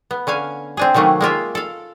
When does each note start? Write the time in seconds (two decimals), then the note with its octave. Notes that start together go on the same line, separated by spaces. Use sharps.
0.11 B3
0.27 D3 C#4 F5 G#5
0.77 C4 D4 G#4
0.94 C3 D#3 F#3 A3 A#3 C#4
1.21 G#3 A#3 F4 E5
1.55 A4 F5